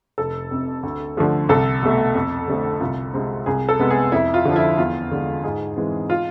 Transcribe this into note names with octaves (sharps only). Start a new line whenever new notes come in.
F1 A4
F2 C3
D2
D3 F3 A3
C2 A4
B2 A3
F2
D3 A3 C4
C2 F4
C3 G#3 C4
C2 G#4
A4
C3 G#3 B3
G#4
F2 E4
F4
D3 F3
E4
E2 F4
D3 G#3
G#2 G#4
E3 G#3 C4
F4